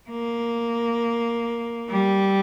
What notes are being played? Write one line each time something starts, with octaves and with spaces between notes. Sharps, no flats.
A#3
G3